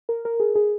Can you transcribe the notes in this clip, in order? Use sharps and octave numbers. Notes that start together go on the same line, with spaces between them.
A#4
A#4
G#4
G#4